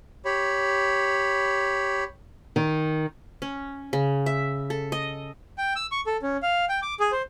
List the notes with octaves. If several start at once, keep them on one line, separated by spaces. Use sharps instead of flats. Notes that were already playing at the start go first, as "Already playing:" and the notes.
G4 C#5 B5
D#3
C#4
C#3
E5
A4
D#5
G5
E6
C#6
A4
C#4
F5
G5
D6
G#4
C5